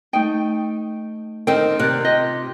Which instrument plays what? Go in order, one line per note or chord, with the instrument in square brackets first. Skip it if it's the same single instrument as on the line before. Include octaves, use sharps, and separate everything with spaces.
[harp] A3 D#4 [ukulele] G5
[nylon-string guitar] D#3 C4 [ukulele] A4 A#4 G5
[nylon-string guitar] C3 [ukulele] A#4 D5 [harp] F#6
[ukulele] F4 G4 D#5